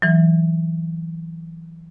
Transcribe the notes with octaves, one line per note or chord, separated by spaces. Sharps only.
E3 F#3